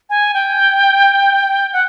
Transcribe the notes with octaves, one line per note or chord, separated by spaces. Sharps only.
G#5
G5
F#5